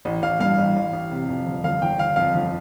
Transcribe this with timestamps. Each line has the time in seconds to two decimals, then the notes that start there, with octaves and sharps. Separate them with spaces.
0.05 A1
0.22 A1 F5
0.40 G2 F5
0.58 A1
0.76 A1
0.93 A1
1.11 C3
1.29 F2
1.46 G1
1.64 G1 F5
1.82 G1 G5
1.98 G1 F5
2.16 F2 F5
2.34 G1